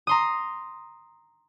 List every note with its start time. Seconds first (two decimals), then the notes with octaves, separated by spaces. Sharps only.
0.07 A#5 C6 D#6